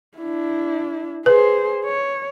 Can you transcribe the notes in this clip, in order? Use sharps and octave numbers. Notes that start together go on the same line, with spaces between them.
D4 E4
G#4 B4 C5
C#5